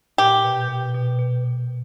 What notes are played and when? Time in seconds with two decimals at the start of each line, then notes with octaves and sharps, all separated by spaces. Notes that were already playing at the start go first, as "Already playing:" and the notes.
0.18 A#2 G4
0.44 B2
0.69 B2
0.94 B2
1.19 B2
1.44 B2